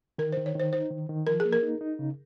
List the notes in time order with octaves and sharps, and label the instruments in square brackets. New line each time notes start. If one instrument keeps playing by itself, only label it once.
[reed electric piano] D#3 [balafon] A#4
[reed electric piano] D#3 [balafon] C5
[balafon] C#5
[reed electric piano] D#3 [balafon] C5
[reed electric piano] D#4 [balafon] C5
[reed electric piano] D#3
D#3
[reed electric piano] F3 [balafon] A#4
[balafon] G#4
[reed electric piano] A#3
[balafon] A#4
[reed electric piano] D#4
D#4
C#3